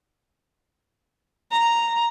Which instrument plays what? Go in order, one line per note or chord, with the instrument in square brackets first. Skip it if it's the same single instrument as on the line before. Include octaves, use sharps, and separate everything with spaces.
[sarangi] A#5